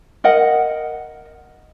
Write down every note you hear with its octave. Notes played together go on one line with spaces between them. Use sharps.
A#4 D#5 F#5